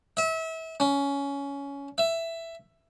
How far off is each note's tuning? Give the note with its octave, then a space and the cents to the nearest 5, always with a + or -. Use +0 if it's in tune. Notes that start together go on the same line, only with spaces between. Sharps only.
E5 -30
C#4 +15
E5 +10